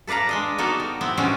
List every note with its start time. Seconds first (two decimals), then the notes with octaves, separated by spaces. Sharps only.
0.07 A4 B4 D5 F5 A#5
0.29 G#3 D4 D#5
0.58 A#3 B3 D#4 F#4 A4
0.80 G3
1.01 B3 C4 E4
1.17 B2 D3 G3 G#3 C#4 F#4